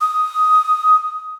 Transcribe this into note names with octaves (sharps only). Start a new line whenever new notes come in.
D#6